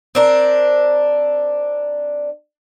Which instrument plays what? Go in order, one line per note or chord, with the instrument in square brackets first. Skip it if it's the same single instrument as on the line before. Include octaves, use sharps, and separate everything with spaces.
[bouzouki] C4 D4 A#4